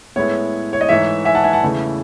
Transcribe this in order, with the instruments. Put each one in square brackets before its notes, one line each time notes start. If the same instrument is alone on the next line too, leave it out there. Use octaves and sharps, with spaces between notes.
[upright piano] A2 G#3 B3 E4 C#5
C#5
D#5
G#2 E3 A3 D#4 C#5 E5
E5 G#5
F#5 A5
E5 G#5
F#5 A5
E2 C#3 E3 A3 E4